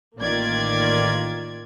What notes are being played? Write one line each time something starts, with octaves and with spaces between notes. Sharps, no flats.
A1 D#3 A#3 F4 D5 G#6